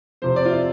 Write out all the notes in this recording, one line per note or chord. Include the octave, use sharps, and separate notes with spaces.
F2 C3 F3 C5
D5
F4
E4